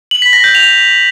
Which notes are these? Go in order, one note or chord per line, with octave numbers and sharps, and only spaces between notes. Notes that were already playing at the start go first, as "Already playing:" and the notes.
F#7
B6
A#6
G6
F7